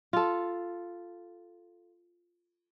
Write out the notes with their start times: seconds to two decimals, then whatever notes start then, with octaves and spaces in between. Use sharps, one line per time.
0.13 F4 A4